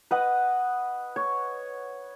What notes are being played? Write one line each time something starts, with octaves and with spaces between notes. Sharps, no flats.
B4 D#5 F#5 D#6
C#5